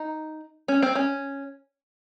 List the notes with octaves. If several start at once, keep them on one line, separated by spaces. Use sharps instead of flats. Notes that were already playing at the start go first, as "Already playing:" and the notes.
Already playing: D#4
C#4
C4
C#4